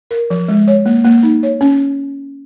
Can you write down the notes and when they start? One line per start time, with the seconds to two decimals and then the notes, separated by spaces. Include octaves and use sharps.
0.11 A#4
0.30 F3
0.48 G#3
0.68 C#5
0.86 A#3
1.04 A#3
1.23 D#4
1.43 C#5
1.61 C#4